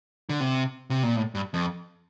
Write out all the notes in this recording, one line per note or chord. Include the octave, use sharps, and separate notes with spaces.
D3
C3
C3
A#2
A2
G2
F2